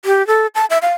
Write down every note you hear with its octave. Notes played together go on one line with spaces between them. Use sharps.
G4
A4
A5
E5
F5